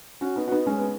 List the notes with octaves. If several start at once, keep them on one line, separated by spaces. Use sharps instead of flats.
C#4 F#4
B3 D#4
F#4
B3 D#4
G#3 C#4
B3